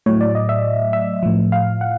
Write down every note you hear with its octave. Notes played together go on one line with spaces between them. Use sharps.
A2 F#3 C#5
D5
D#5
E5
E5
A2 F3
F5
F#5